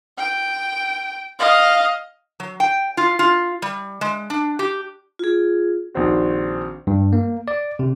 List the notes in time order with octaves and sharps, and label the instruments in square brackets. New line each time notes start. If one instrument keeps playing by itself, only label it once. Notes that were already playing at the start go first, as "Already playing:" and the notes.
[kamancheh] G5
D#5 F5
[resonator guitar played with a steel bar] F#3
G5
F4
F4
G3
G#3
D4
G4
[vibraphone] F4 G#4
[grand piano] A#1 D#3 C4 F#4
[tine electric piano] G2
A#3
D5
C3